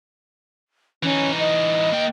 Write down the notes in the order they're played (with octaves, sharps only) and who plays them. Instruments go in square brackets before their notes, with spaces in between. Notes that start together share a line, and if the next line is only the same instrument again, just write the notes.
[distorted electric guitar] E3 D#4 [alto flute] C#4
[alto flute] D#5
[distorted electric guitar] A#3 G5